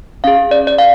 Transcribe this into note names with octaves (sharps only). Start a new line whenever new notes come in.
C#4 G#4 F5
D5
D5
F5